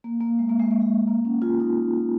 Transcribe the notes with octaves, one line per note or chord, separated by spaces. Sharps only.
A#3
A#3
G#3
A#3
G#3
A#3
G#3
A#3
C#4
F4
D#4